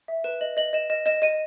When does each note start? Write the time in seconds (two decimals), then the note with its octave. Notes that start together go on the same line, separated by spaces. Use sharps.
0.08 E5
0.24 B4 E7
0.41 D#5 F#7
0.57 D#5 F#7
0.73 D#5 E7
0.90 D#5 E7
1.06 D#5 E7
1.22 D#5 D#7